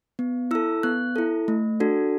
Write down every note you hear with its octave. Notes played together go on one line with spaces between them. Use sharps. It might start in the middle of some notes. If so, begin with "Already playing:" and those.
B3
E4 A4 E6
B3 F#6
E4 A4
A3
D4 F#4 A4